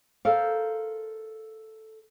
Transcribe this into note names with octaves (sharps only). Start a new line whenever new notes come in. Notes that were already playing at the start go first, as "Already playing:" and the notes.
A4 A#4 C5 F5